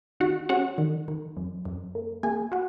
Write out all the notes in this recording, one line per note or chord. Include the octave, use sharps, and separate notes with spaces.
D#3 F#4 F#5
C#4 F#4 F#5
D#3
D#3
F#2
F#2
A#3
A#3 G#4 G#5
F#4 F#5